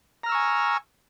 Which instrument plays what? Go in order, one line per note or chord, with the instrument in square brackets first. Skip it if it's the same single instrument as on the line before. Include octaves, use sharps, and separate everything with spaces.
[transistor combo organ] A#5
F6
E6
C#6
G#5